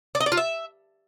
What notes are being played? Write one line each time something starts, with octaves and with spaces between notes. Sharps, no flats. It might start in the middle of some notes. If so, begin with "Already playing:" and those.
D5
D#5
D5
F4
E5